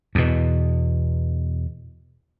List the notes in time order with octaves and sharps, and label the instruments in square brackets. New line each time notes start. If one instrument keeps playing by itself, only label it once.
[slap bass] E2 B2